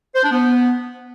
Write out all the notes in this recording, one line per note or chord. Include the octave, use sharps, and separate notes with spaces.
C5
D4
B3